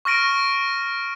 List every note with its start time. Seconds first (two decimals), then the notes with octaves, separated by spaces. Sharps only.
0.05 C#6 F6 A#6 D7 D#7